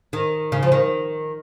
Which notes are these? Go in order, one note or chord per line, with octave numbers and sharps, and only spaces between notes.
D#3
C#3
F3
D#3